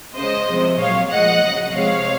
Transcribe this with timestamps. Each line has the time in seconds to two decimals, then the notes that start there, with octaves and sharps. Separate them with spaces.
0.17 C#3 G#3 C5 D#5
0.48 C3 F3 G#3
0.80 A#2 F#3 C#5 F5
1.11 A#2 F3 G#3 D#5 F#5
1.43 C#3 F#3
1.74 C3 F3 G#3 C#5 F5